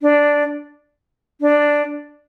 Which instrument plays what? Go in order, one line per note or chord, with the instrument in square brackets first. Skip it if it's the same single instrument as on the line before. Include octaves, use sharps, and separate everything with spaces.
[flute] D4
D4